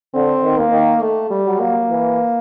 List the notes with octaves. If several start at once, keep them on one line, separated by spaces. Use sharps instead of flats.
D3 C4
D#3
A#3
D#3
A3
G3
F#3
A#3
E3